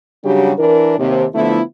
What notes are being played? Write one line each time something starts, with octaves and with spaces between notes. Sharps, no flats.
C#3 F#3 G3 D4 F#4 G4
E3 D4 E4 A#4
D#2 C3
D3 F3 A3 B3 E4